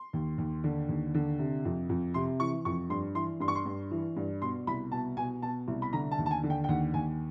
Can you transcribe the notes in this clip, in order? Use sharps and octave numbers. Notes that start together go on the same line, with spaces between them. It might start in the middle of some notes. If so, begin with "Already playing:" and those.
Already playing: C6
D#2
D#2
D3
D#2
D3
C3
F2
F2
C3 C6
E3 C#6
F2 C#6
G2 C6
E3 C6
G2 C6
C#6
C6
G2
E3
G2
B2 C6
C2 B5
B2 A5
B2 G#5
B2 A5
C2
B5
D3 A#5
A5
D#2
A5
G#5
D3
G5
G5
D#2 F#5
D#2 G#5